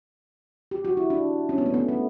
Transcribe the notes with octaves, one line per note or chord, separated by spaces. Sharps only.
G4
F#4
E4
D4
C#4
B3
A3
B3
A3